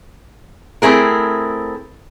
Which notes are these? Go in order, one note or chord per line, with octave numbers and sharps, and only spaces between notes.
A3 C4 E4 G#4 A#4